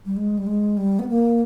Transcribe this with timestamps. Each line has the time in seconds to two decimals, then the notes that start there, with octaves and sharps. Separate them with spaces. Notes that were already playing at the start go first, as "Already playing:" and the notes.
0.06 G3
0.17 G#3
0.38 G3
0.47 G#3
0.77 G3
0.99 B3
1.09 A#3